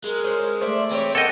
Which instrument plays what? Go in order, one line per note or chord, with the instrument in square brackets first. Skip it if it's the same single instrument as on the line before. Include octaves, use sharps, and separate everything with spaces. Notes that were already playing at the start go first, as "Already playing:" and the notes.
[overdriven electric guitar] G#3 [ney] A#4
[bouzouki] C#4 C5
[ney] A3 [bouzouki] C5 D5 E5
[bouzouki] E3 G4 C#5 [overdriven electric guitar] C4
[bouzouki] A#3 F#5 G5 [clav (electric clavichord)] A4 D#5